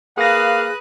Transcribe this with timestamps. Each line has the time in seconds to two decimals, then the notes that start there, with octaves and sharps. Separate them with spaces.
0.18 A#3 G#4 B4 F5 D#6 F#6 A#6